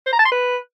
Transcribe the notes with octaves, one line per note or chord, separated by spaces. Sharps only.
C5
A#5
A5
C6
B4